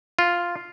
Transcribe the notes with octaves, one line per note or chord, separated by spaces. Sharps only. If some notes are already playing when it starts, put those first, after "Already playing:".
F4